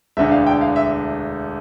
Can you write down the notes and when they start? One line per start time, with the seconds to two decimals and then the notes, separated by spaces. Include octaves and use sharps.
0.17 E1 D2 D3 E5
0.32 F5
0.46 G5
0.61 F5
0.76 E5